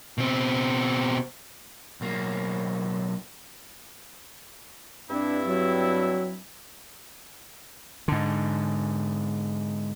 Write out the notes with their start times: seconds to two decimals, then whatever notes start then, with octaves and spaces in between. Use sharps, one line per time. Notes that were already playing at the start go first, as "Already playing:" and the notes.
0.18 B2 C4
2.01 B1 A#3
5.09 G2 C4 D4 E4
5.45 F#3
8.08 G#2 D3